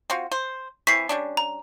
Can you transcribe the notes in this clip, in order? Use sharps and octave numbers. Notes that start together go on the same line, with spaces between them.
C4 F4 F#4
C5
E3 C4 C#6 B6 C7
G3 C#4 D4
A#5